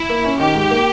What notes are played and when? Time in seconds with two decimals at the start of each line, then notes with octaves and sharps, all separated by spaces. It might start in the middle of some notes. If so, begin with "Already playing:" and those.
Already playing: E4
0.09 A#3
0.24 C#4
0.39 D#3 G4
0.55 G#2
0.71 A#3